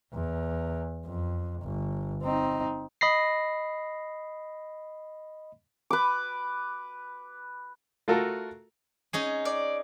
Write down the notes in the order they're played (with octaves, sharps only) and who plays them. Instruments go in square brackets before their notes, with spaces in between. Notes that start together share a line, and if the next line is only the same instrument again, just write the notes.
[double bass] E2
F2
G1
C4 D#4
[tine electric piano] D#5 B5 A#6 C7
[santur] B4 D6
[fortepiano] A3 F4 F#4 A4 A#4
[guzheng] C#4 D#4 G#4
[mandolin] D5